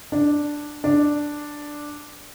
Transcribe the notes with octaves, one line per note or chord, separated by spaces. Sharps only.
D4
D4